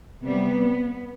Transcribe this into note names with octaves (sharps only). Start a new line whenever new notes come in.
C3 G3 B3